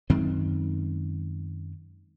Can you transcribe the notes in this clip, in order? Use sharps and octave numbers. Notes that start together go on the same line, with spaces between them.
F#2 D#3 G#3 C4